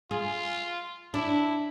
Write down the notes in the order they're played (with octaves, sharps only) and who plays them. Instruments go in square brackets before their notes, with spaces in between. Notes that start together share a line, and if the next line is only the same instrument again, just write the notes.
[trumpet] F4 [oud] G#4
[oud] D4 [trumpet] E4